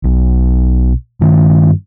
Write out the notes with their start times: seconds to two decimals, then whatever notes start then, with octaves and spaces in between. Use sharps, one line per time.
0.04 B1
1.21 G2 D#3